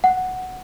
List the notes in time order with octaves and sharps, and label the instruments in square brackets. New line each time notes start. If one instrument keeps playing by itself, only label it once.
[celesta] F#5